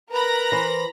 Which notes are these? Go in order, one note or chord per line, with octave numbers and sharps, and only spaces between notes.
A#4 B4 A#5 B5 A#6
E3 C5